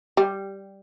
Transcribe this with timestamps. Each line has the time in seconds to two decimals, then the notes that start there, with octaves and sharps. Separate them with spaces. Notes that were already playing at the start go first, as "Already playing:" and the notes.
0.17 G3